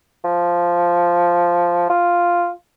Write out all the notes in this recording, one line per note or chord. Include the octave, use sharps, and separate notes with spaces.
F3
F4